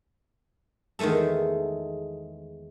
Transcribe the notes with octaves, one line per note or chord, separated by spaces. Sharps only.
E2 D#3 G#3 A3 A4